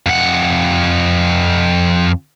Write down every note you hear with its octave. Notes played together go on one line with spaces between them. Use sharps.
F2 F#5